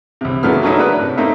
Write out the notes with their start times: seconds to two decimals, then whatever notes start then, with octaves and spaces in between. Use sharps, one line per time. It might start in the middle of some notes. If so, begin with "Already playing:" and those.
0.21 C2 C3
0.43 A#2 C#3 F#3 A3 B3 F6
0.63 F#3 A3 C#4 D#4 E4
0.78 C#4 D4 F#4 A#4 B4
0.99 A2 C3
1.18 A3 A#3 C4 D#4